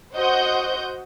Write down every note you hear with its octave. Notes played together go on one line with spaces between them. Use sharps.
F#4 C5 D#5 F#5 G6